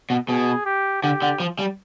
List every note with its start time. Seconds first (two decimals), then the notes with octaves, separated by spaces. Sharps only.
0.10 B2
0.29 B2 G#4
0.65 G4
1.03 D3 G4
1.22 D3
1.40 F3
1.59 G3